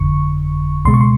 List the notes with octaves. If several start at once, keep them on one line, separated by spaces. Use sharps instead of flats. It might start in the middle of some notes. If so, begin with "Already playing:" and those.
Already playing: G1 F2 D3 C#6
C#2 B2 G#3 C6
C#6
C6